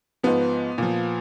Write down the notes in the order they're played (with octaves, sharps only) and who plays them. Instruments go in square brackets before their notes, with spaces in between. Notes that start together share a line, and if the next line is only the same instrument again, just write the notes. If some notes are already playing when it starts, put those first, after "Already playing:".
[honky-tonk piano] G#2 F3 B3
A#2 F3